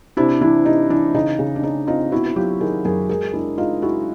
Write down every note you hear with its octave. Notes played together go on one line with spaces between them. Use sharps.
C3 D4 E4
E3 D4 E4
C3 D#4
E3 D4
C#3 D#4
C#3
D4
C#3 D#4
C4 D#4 F4
B3 E4 F#4
F#3 F4 G4
D#3 G#4 A#4
F#2 G#4 A#4
G#3 G#4 A#4
G#3 D4 E4
G#3 D#4 F4
G#3 E4 F#4